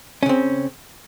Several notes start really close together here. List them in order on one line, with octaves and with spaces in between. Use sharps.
C#4 C#3 C4